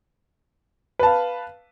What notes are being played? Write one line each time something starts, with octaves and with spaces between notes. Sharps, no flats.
B4 F5 A5